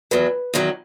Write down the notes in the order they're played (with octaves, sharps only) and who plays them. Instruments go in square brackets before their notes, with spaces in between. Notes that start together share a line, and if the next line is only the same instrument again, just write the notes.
[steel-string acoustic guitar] E2 D#3 F#3 [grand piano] B4
[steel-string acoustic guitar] E2 D#3 F#3